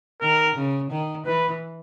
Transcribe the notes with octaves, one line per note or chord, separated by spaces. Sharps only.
D#3 A#4
C#3
D#3
E3 B4